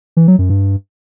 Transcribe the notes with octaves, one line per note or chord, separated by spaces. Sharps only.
E3
F#3
F#2
G2